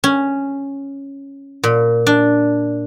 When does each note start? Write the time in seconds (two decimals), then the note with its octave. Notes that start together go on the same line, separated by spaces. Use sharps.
0.04 C#4
1.63 A#2
2.07 D4